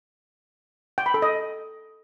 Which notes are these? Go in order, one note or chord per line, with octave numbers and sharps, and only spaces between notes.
G5
B5
A4
D#5